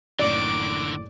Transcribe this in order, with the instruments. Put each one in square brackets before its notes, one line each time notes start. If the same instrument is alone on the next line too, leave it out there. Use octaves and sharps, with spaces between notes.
[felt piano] F#1 A2 [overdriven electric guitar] D3 D#3 [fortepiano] D5 [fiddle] D6